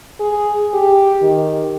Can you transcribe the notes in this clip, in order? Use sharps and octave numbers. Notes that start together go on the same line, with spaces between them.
G#4
G4
D#3